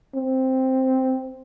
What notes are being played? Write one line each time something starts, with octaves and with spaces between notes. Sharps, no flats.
C4